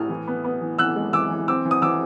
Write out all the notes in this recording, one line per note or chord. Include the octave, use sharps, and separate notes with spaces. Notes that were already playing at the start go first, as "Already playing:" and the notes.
Already playing: A2 D#6 F6
E3
B3
B3
E3
E3 E6 F#6
G#3
E3 D6 E6
E3
C4 D6 E6
E3
D#6
E3 D6 E6